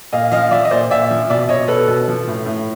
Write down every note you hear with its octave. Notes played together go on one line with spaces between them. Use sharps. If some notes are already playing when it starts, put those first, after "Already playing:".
A#2 D#5 F5
F3 D#5 F5
F3 D5 E5
D#5
A#2 C5 D5
A#2 D5 E5
F3
B2 D5 E5
B2 C#5 D#5
B2 A4 B4
B2
F3
A2
A2